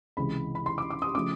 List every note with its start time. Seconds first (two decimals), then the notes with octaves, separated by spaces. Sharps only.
0.17 C#2 C3 E3 G#3 B5
0.55 B5
0.66 C6
0.78 D6
0.90 D6
1.02 D#6
1.15 C#3 F3 A3 D6